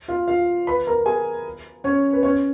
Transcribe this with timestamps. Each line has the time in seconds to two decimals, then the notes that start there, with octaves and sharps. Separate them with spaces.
0.08 F4 F5
0.28 F4 F5
0.67 B4 B5
0.87 A#4 A#5
1.06 G#4 G#5
1.84 C#4 C#5
2.13 B4
2.23 C#4 C#5